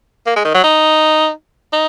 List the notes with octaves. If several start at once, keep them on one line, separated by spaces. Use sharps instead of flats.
A#3
G#3
D#3
F#3
D#4
D#4